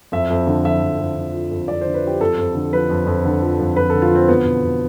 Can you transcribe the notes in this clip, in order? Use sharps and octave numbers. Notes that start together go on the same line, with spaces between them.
F2 E5
F2
D3
F3 E5
F2
F2
D3
F3
F2
F2 D5
C5
D3
B4
F3 G4
F2 A4
F2
D3
F3 B4
F2
F2
D3
F3
F2
F2 B4
D3 A4
F4
F3 C4
E2 B3
B2
B2